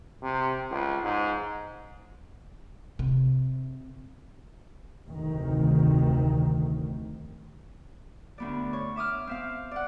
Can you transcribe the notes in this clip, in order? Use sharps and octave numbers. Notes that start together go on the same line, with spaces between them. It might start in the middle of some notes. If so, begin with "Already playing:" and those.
C3
C#2
G#2
C3
F1 D2 C3 D#3
D2 B3 D5
C#5
E5 D6 D#6 F6
C4 E5 F5
D5 F#5